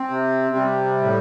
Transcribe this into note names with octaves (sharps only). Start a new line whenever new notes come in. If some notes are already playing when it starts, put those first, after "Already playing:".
Already playing: C4
C3
G3
A2